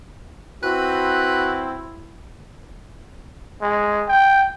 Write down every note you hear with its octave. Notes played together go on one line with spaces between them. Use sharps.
C4 E4 F#4 B4
G#3
G5